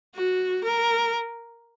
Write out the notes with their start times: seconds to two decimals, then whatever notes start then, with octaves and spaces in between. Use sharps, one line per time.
0.15 F#4
0.63 A#4